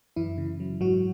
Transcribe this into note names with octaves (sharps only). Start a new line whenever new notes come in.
F#2 E3 E4
C#3
F#3
G#2 F#3 F#4